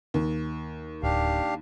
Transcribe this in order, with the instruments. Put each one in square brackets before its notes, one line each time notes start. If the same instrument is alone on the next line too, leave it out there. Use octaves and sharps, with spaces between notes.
[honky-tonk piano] D#2
[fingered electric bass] D1 [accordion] D4 G4 F5